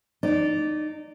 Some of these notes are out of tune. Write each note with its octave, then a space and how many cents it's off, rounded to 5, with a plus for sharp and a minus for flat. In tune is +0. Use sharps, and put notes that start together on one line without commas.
D#4 -25 D5 -15